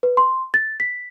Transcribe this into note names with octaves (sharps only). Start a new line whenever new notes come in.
B4
C6
A6
B6